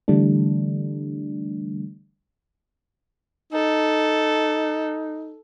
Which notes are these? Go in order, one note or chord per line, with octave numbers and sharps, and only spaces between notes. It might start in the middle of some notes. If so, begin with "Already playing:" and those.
D3 E3 G3 A3 D4
D#4 A4